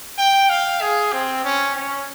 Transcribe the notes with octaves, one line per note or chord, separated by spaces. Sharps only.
G5
F5
G#4
C4
C#4
C#4